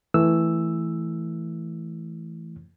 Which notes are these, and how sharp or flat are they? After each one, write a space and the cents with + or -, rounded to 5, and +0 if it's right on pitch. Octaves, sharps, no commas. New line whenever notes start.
E3 +0 A3 +0 E6 +0